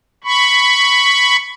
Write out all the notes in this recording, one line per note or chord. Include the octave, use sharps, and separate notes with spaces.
B5 C#6